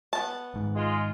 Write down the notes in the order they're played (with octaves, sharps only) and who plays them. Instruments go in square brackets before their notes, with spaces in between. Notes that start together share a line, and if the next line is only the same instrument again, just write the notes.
[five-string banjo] B3 A5
[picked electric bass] G#1 G#2
[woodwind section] G#3 F4